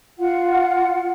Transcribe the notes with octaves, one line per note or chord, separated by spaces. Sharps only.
F4 F#5